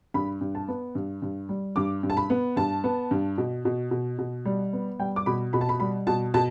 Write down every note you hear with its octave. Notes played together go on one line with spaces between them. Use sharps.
G2 B5
G2
A5
B3
G2
G2
G3
G2 D6
G2
A5
B5
B3
G2 A5
B3
G2
B2
B2
B2
B2
G3
B3
G3 G5
D6
B2 B5
B2 B5
A5
B5
G3 B5
B2 A5
B2 A5